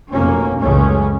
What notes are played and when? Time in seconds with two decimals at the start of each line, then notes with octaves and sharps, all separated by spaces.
0.12 F1 B2 A#3 C#4
0.61 F#1 C#2 C#3 A3 C#4